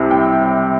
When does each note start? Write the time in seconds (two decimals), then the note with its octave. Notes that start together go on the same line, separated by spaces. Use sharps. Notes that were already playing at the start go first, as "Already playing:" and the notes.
Already playing: C2 C3
0.11 G5